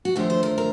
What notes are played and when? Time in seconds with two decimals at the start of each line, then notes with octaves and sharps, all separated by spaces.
0.05 F#4
0.16 D#2 D3 F3 A3 G4
0.30 C5
0.43 A#4
0.58 A#4